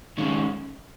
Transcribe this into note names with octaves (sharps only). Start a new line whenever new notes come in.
D#3 G#3 C#4